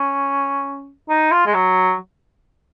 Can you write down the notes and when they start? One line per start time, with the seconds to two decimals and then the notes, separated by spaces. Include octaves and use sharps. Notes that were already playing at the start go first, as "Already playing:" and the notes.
Already playing: C#4
1.09 D#4
1.32 F4
1.47 G#3
1.54 F#3